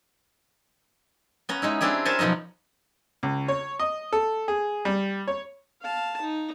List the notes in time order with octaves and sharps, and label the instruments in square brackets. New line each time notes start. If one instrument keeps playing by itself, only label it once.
[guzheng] B3 C#4 A#5
G#3 D#4 E4
C4 D4 E4 G4 G#4
A#4 C5 C#5 E5 G#5 A5
F#2 B2 F3 D#4 D#5
[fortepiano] C#2
C#5
D#5
A4
G#4
G3
C#5
[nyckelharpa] F5 A5
D#4